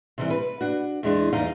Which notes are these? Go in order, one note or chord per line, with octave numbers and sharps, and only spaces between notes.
C3 E3 G3
B4
D4 F#4
E2 G#3 D4
E2 G3 D#4 F5